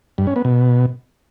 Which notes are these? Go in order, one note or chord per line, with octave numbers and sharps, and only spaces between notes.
G2
C#4
B3
B2